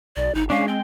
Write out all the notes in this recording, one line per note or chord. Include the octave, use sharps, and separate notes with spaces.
B1 D5
G1 D#4
G#3 C#4 D4 F5
C4 G5